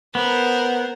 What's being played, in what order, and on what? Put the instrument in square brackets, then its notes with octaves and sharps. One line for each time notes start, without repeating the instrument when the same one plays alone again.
[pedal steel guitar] B3 [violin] A#4 C5